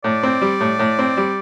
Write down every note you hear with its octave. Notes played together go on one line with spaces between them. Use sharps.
A2 D5
C4
G3
A2
A2
C4
G3